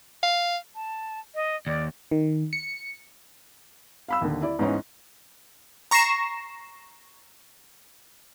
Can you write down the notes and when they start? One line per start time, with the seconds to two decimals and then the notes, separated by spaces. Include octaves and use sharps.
0.23 F5
0.75 A5
1.35 D#5
1.67 D#2 D5
2.11 D#3
2.53 C#7
4.08 F5 B5 E6
4.22 D#2 D3
4.42 E4 D5
4.59 G#2 E3 B3 C#4 D#4
5.91 A#5 C#6 A#6 C7 E7